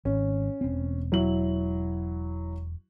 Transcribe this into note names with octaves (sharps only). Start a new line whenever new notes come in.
G#1 C#4
E1 C4
F#3 E4 F#7